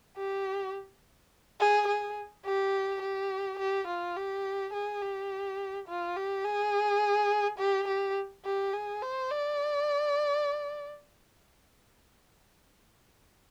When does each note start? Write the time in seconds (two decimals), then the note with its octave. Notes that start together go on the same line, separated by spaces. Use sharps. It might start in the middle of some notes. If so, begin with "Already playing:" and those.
0.17 G4
1.60 G#4
1.88 G#4
2.45 G4
3.02 G4
3.59 G4
3.88 F4
4.16 G4
4.73 G#4
5.02 G4
5.88 F4
6.16 G4
6.45 G#4
7.59 G4
7.88 G4
8.45 G4
8.73 G#4
9.02 C5
9.31 D5